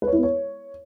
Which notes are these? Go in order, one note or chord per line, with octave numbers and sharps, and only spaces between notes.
B4
C#5
E4
B3
C#5